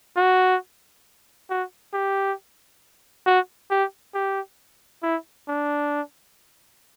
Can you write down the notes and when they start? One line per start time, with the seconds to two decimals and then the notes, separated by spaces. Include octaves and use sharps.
0.17 F#4
1.50 F#4
1.93 G4
3.26 F#4
3.71 G4
4.14 G4
5.03 E4
5.48 D4